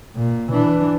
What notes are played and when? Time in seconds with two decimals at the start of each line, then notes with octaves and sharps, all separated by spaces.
0.16 A#2
0.52 E3 D4